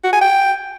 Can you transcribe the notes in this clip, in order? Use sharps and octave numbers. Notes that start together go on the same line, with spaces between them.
F#4
G#5
G5